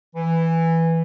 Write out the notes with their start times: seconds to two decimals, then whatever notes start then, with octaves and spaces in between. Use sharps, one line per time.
0.15 E3